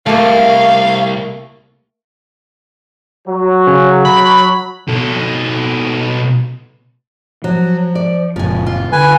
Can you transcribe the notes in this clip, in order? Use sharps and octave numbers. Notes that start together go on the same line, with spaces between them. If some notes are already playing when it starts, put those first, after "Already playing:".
C2 A3 A#3 F5
F#3
C#3
B5
B2 A4
F3 F#3
D5
F#1 A#2 F3 G#5
F4
D3 B4 G#5